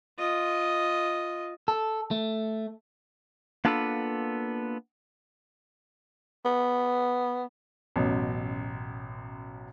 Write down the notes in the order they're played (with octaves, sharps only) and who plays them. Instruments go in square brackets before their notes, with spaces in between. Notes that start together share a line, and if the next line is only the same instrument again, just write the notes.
[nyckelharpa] F4 D#5
[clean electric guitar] A4
A3
A#3 B3 D4 F4 A4 B4
[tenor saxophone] B3
[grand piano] A1 F#2 B2